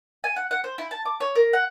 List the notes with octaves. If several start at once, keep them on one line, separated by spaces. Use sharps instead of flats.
G#5
F#5
F#5
C5
E4
A5
D6
C#5
A#4
F#5